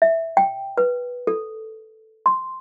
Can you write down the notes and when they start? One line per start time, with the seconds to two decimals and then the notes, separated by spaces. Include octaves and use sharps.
0.02 E5
0.37 G5
0.78 B4
1.27 A4
2.26 C6